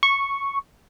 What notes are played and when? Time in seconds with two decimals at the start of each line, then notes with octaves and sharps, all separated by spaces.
0.03 C#6